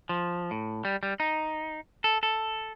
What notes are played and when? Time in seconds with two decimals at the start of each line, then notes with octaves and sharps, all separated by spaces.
0.09 F3
0.51 A2
0.85 G3
1.03 G3
1.20 D#4
2.04 A4
2.23 A4